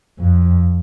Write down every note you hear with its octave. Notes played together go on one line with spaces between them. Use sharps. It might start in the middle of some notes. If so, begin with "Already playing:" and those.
F2